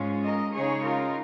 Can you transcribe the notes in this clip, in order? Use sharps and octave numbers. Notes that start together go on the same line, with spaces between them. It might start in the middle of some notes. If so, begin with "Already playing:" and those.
Already playing: G#2 G#3 C#4 F4
A#4 D#5
C#3 G#3 D#4 G#4 C#5
F4 A#4